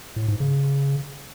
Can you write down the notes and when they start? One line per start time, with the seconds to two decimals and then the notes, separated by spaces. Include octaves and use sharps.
0.16 A2
0.28 G#2
0.40 C#3